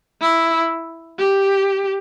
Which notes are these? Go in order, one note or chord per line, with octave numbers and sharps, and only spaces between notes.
E4
G4